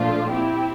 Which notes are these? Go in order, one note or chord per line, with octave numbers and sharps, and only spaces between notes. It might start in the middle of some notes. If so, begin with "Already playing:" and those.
Already playing: A#2 F3 A3 D4 F4
C4 E4 G4